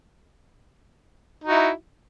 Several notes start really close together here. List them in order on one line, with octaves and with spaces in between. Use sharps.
D#4 F#4 E4